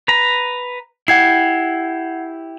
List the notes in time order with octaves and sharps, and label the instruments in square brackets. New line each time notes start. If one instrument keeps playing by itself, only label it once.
[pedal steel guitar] B4 A#5
[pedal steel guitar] E4 G4 [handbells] F#5 G#6 C7